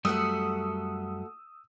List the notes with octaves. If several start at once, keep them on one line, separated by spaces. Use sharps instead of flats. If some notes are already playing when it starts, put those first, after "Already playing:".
F#2 G3 A3 F#4 F#5 D#6 E6